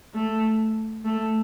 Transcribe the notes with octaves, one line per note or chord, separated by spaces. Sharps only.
A3
A3